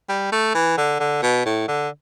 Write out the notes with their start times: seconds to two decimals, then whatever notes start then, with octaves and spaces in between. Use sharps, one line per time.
0.09 G3
0.32 A3
0.55 E3
0.78 D3
1.00 D3
1.23 B2
1.46 A2
1.68 D3